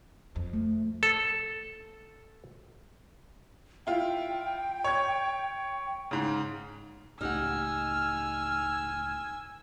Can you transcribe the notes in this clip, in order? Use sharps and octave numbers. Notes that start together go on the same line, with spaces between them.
F2
A3
A4
E4 F4 G5
C#5 G#6
G#2 C#3
C#2 A2 D#4 G4 F#5 G#5 E6 F6